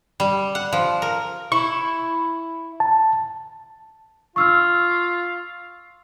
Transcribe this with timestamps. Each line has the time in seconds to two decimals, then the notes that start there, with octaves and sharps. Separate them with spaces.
0.20 G3
0.55 F#5
0.73 F3
1.02 A#4
1.52 E4 C#6
2.80 A5
4.36 F4 C#6 E6 F6